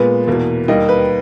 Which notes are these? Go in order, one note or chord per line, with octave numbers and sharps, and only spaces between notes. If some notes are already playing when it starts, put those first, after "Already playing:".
Already playing: A#2 G#3 B3 B4
E2 B2 A#3
D#2 D#3 G3 A#3 D#5
B4